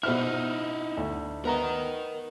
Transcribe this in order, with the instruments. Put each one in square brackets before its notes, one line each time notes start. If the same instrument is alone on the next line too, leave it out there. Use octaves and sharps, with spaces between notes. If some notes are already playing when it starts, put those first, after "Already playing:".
[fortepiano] B2 C5 F6 [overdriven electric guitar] D#4 E4
[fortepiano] D2
[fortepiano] B3 A#5 [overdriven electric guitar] A#4 D#5